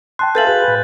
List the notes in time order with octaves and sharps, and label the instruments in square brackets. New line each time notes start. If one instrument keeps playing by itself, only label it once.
[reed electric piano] G5 A5 C6 [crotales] F#6
[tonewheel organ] A4 B4 [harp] E5 F5 G#5 [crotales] G6 A6 F#7
[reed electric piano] F#4 G#4 [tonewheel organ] B4
[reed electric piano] A2